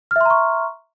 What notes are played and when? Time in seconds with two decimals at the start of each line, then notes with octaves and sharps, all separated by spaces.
0.11 F6
0.16 E5
0.21 C6
0.25 A#5
0.30 C#6